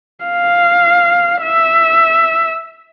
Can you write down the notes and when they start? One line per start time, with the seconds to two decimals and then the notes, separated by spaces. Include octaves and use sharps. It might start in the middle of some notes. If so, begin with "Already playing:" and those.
0.24 F5
1.42 E5